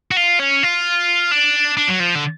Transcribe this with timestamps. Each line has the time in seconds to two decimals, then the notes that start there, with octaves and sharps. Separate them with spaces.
0.11 F#4
0.17 F4
0.39 C#4
0.63 F4
1.31 D4
1.77 D4
1.88 F#3
2.00 F3
2.15 D3